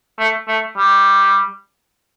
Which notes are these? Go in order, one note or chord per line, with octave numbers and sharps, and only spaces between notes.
A3
A3
G3